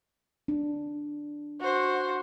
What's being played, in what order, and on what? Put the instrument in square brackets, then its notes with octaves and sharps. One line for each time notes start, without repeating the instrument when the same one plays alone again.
[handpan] D4
[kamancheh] F#4 C5